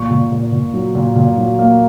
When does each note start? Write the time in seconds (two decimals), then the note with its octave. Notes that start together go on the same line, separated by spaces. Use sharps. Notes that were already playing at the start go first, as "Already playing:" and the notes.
Already playing: A#2 C#6
0.10 A#2
0.32 A#2
0.52 A#2
0.74 F#3
0.95 A#2
1.16 A#2
1.38 F#3
1.59 A#3